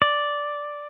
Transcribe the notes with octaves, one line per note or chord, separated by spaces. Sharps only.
D5